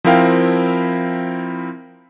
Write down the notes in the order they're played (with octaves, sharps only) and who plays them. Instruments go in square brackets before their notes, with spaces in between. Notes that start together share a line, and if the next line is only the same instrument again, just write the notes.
[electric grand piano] F3 C4 E4 A#4 F5 G5